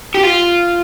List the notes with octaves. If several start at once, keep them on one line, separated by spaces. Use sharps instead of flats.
G4
F4